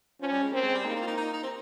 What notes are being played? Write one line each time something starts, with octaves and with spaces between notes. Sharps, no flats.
F3 C#4
G3
G#3
A#3 C4
G#3
G3
A#3 D#4
D#4
F4
D#4
D#4
D#4
C4